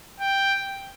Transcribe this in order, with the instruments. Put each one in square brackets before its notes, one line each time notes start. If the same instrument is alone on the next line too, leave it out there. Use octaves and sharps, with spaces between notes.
[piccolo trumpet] G5